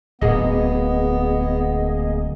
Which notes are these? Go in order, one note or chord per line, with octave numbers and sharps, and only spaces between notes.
D1 A#3 B3 G#4 D#5